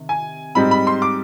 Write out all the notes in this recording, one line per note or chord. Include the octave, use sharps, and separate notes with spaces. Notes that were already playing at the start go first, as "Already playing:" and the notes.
Already playing: C3 D#3
G#5
G#2 G3 C4 D#4 B5
B5
C6
D6